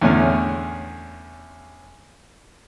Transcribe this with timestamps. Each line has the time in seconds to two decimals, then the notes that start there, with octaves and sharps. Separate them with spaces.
0.02 E2 A2 D3 C#4 G#5 F6